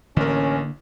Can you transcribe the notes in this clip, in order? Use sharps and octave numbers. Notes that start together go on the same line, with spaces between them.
A1 D3 A#3 C#4 A#4